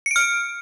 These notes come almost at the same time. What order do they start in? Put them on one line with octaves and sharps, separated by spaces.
C#7 D7 F6